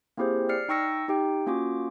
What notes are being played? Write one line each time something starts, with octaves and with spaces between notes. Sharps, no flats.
A#3 C4 E4 G4 G#4 C5
D5 F6 C7 C#7
D#4 G5 C#6 E6 A#6 C#7
D#4 G4 G5
A#3 C#4 F4 F#4 D6